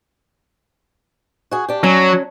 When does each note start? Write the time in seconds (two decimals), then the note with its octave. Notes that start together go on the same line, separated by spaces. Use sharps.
1.51 F#4 G#4
1.68 D4 G4
1.83 F#3 C#4